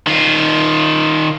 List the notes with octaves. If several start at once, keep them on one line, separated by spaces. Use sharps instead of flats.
D#3 F4